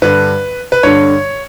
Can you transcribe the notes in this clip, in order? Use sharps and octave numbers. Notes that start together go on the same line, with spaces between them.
G2 D3 B4
B4
G2 D3 C#5